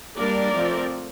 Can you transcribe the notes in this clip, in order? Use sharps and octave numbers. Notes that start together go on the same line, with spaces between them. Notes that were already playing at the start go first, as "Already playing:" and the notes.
G3 A#3 D4 A#4 D5
F3 A3 C4